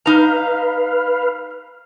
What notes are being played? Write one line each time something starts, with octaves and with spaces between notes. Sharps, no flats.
D#4 B4 F5 A#5